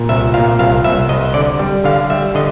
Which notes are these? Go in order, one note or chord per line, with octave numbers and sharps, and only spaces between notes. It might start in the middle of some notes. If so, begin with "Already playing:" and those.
Already playing: A#2
C2 E5
A#2 F5
C2 F5
C2 E5
C2 D#5
D3 D5
G3
D3 F5
G3 E5
D3 D#5